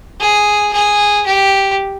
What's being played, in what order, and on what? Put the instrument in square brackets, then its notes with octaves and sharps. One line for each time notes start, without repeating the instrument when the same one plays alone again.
[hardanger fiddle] G#4
G#4
G4